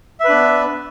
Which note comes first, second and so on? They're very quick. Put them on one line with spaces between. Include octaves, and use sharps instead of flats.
E5 B4 D4 B3